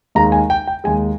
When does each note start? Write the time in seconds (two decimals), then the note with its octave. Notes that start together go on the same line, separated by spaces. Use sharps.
0.15 D#2 D#3 G#3 A#5
0.32 G#5
0.50 G5
0.67 G5
0.84 D#2 D#3 G#3 G#5